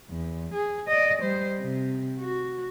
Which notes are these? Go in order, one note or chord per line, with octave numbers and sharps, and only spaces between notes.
E2
G#4
D5 D#5
G3 C5
C3
F#4